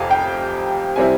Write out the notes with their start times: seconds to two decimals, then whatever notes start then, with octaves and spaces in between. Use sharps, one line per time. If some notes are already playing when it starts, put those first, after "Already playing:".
Already playing: F1 F2 C3 F5 G#5
0.10 G5
0.96 C3 G3 C4 E4 G#5